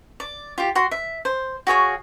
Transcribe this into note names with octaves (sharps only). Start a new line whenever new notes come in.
D5
F4 G4
F#4 C6
E5
C5
F#4 G#4 C#5 F5